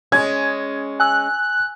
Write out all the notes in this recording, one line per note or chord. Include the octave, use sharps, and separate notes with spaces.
G#3 C#4 G#6
G#5 E6 F#6